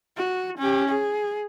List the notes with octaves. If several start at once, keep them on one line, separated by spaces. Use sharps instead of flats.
F#4
C#4 G4
G#4